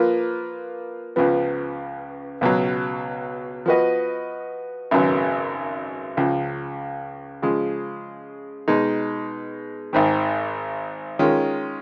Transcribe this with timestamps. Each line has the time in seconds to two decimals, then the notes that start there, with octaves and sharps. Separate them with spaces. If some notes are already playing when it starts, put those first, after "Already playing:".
Already playing: F3 A#3 F4 B4
1.16 C#2 C#3 F3 B3
2.41 C#2 B2 F#3
3.66 F3 B3 F#4 B4 D#5
4.91 G#1 F#2 C#3 F#3 B3
6.17 C#2 C#3 F3
7.42 C#3 F3 G#3
8.68 B2 G#3 D#4
9.93 G#1 G#2 D#3
11.19 D#3 G#3 C#4 F4